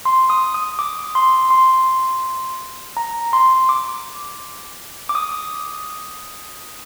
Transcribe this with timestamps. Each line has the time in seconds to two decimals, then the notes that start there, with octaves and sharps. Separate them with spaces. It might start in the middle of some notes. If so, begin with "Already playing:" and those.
0.05 C6
0.30 D#6
0.54 D#6
0.79 D6
1.15 C6
1.50 C6
2.97 A#5
3.33 C6
3.69 D6
5.09 D6
5.15 D#6